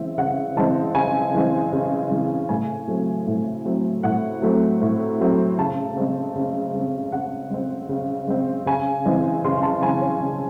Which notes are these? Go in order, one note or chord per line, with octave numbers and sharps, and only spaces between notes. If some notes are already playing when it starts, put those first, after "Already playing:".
Already playing: C#3 E3 G#3 C4 E5
C#3 F#5
E3 G#3 C4 A5
C#3 G#5
E3 G#3 C4
C#3
E3 G#3 C4
A2 G#5
F#3 A3 C4
A2
F#3 A3 C4
A2 F#5
F#3 A3 C4
A2
F#3 A3 C4
C#3 A5
G#3 C4
C#3
G#3 C4
C#3 F#5
G#3 C4
C#3
G#3 C4
C#3 G#5
E3 G#3 C4
C#3 C6
A5
E3 G#3 C4 G#5
C#5
C#3